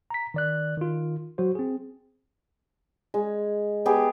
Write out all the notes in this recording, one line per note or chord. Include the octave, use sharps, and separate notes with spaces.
A#5 B6
D#3 D5 F#6
D#3 F4
F#3 F#4 C5
C4 G#4
G#3
B3 G4 G#4 D6